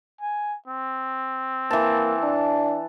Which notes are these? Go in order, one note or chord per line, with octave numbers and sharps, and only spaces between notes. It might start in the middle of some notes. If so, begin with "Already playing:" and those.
G#5
C4
E3 A#3 A5
D4